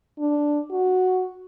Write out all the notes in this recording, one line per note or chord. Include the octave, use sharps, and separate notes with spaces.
D4
F#4